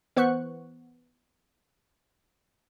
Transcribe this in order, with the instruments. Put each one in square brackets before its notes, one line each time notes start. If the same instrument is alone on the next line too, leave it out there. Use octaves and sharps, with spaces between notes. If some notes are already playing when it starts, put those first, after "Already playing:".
[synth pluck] E3 B3 C5 F#5 C#6 F#6